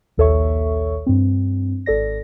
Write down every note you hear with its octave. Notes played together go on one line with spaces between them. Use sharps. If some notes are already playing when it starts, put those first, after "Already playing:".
A#1 D#2 A4 C#5 E5 C#6
G2 C4
G#1 A4 D5 A#6